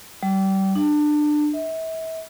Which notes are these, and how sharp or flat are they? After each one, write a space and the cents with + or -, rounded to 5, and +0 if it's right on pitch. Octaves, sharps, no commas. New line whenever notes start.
G3 -30
D4 +25
E5 -35